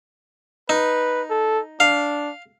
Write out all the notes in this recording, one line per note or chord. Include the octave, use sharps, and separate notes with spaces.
D#4 B4
A4
D4 F5